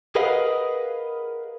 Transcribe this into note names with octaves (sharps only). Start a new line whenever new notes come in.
G#4 A#4 B4 D#5 F5 F#5